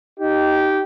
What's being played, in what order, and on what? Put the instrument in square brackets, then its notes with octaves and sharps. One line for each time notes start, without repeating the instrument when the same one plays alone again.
[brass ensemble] D#4 G4